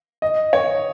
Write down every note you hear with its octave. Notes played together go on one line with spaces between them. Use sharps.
D#5
C#5